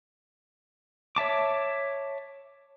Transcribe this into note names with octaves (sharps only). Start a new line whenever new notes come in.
C#5 E5 A5 D6